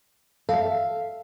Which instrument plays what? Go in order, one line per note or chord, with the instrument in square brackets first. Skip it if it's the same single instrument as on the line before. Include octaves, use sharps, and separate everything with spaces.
[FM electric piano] A4 [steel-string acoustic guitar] E5 F5